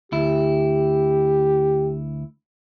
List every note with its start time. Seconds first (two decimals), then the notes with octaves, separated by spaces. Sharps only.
0.12 D2 E4 G4